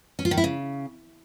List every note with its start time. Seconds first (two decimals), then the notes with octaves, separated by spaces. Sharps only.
0.19 C#4
0.25 F4
0.31 D#3
0.37 E4
0.44 C#3